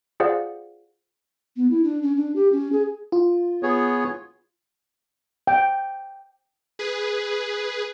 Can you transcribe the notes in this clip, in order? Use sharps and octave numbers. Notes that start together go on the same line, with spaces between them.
F4 G#4 C5 D5 F5 F#5
B3
E4
D4
C#4
D4
G4
C#4
G#4
F4
B3 G#4 C#5
G5
G#4 B4